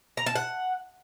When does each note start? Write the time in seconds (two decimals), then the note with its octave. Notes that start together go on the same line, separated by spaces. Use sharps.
0.17 A#5
0.26 A5
0.35 F#5